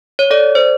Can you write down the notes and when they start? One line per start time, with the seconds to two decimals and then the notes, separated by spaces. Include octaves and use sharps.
0.19 C#5
0.31 A4 D5
0.55 C5